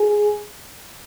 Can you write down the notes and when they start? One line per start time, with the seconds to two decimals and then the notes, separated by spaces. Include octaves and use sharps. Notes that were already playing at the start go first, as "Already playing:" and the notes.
Already playing: G#4